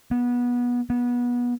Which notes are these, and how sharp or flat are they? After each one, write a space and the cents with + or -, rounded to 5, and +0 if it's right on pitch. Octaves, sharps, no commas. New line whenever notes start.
B3 -20
B3 -25